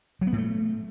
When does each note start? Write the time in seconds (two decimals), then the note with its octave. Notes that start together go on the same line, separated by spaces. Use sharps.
0.21 F#3
0.27 B3
0.32 A2
0.38 A3